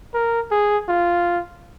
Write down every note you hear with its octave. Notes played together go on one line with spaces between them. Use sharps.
A#4
G#4
F4